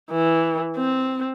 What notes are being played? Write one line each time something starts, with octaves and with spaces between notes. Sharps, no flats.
E3
C4